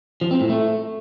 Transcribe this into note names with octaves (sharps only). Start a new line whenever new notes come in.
F3
C4
A2
A3